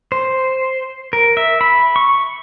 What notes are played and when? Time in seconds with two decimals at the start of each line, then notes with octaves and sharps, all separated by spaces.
0.12 C5
1.13 A#4
1.37 E5
1.61 B5
1.96 C#6